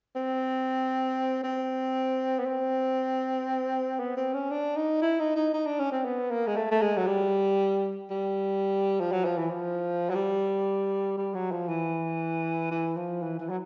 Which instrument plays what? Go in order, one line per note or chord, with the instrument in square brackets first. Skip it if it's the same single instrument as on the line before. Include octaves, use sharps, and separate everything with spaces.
[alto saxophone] C4
C4
B3
C4
B3
C4
C#4
D4
D#4
E4
D#4
D#4
D#4
D4
C#4
C4
B3
A#3
G#3
A3
A3
G#3
F#3
G3
G3
F3
F#3
F3
E3
F3
F#3
G3
G3
F#3
F3
E3
E3
F3
E3
E3
F#3